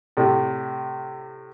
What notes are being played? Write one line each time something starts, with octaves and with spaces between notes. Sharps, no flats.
A2 C3 G3